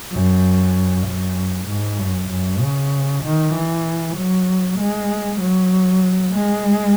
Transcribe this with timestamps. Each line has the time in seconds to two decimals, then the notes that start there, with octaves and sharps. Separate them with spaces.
0.12 F#2
1.06 F#2
1.68 G#2
1.99 F#2
2.30 F#2
2.61 C#3
3.23 D#3
3.54 E3
4.16 F#3
4.79 G#3
5.40 F#3
6.34 G#3